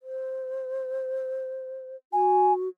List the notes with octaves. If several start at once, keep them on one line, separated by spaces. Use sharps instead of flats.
C5
F#4 G#5